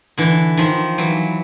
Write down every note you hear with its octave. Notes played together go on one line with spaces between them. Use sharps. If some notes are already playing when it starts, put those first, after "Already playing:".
D3 E3
D#3 F3
E3 F#3